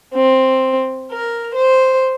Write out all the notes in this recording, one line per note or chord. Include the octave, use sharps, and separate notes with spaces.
C4
A#4
C5